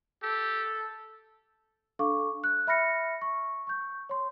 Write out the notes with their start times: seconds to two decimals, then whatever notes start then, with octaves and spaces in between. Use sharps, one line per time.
0.23 G4 A4
1.99 D4 A4 F5 C#6 D6
2.44 F#6
2.67 E5 B5 F6 A#6 C#7
3.22 C#6
3.67 C#6 G6
4.09 C#5 C6